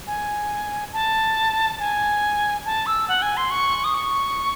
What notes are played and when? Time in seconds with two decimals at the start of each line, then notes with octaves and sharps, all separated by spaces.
0.07 G#5
0.93 A5
1.79 G#5
2.66 A5
2.86 E6
3.08 F#5
3.22 G#5
3.37 C6
3.51 C#6
3.84 D#6
3.94 C#6